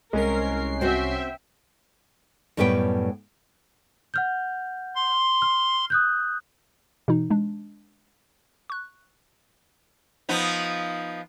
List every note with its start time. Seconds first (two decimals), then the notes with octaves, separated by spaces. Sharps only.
0.13 C2 G#3 C#4 A#4 C7
0.81 C4 F#4 C5 E5 G5
2.57 F#2 A2 G3 B3 B4 G5
4.14 F#5 F6 G6
4.95 C6
5.42 F6
5.90 D#6 F#6 G6
7.08 B2 E3 D#4
7.30 G#3 D4
8.70 C#6 F#6
10.29 F3 B3 D#4